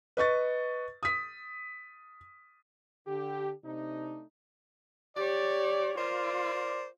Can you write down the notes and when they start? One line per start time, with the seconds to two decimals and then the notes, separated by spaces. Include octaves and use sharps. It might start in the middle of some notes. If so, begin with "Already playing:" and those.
0.17 B4 D#5 C#6 A6
1.03 D#6 B6
3.07 D3 G4
3.64 C3 A3 D4 D#4
5.17 G4 C#5 D5
5.98 F4 A#4 C5 D5